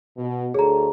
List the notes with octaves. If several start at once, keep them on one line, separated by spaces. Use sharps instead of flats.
B2
D2 G#4 A4 C#5 A#5